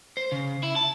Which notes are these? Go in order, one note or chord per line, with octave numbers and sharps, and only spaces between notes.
C5
C#3
E4
A5